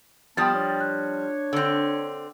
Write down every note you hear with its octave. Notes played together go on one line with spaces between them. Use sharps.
F3 G3 B3 G5 A5 D#6 A6
D4 C#5
F#6
D3 C4